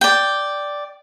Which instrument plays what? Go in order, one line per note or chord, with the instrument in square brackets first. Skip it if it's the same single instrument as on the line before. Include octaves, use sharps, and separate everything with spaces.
[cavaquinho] D5 G5